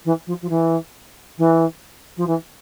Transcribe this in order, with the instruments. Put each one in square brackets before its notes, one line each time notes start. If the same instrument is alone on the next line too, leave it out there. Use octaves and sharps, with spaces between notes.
[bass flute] E3
F3
F3
E3
E3
F3
E3